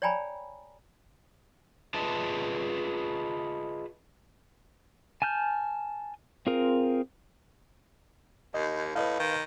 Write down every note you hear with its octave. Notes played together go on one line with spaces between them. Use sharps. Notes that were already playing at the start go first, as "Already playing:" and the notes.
C#5 D5 G5 G#5 A#5 B5
F4 G#4 B4 D#5 E5 A5
G#5 A5 F6 G6
C4 F4 G#4 A#4
D#2 D#5
A2 B4 D#5 F5
D#3